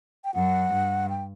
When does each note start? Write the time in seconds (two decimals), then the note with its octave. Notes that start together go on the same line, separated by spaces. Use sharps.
0.25 G5
0.34 F#2 F#5
0.73 G2
1.10 G5